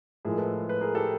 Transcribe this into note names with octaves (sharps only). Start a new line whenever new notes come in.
A2 F3 G#3 G#4 A#4
A4 B4
B4
G#4 A#4
G4 A4